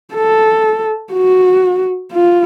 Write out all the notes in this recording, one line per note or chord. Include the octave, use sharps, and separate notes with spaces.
A4
F#4
F4